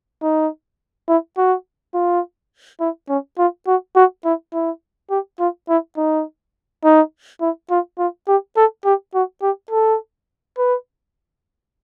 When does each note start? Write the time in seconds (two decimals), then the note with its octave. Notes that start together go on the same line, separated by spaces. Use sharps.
0.23 D#4
1.08 E4
1.37 F#4
1.94 F4
2.81 E4
3.09 C#4
3.38 F4
3.67 F#4
3.96 F#4
4.25 E4
4.53 E4
5.11 G4
5.39 F4
5.69 E4
5.98 D#4
6.84 D#4
7.41 E4
7.71 F4
7.99 F4
8.28 G4
8.57 A4
8.85 G4
9.15 F#4
9.43 G4
9.71 A4
10.58 B4